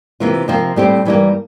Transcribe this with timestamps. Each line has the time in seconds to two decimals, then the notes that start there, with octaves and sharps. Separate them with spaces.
0.20 C3 E3 A#3 F4
0.48 C3 F3 A#3 F4 C5
0.76 A2 G3 C4 G4 C5
1.05 G2 E3 G3 A#3